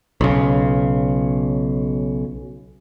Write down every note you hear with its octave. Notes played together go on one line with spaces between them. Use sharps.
B1 C#3